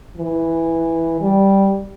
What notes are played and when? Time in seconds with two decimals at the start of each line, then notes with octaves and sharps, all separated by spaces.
0.17 E3
1.21 G3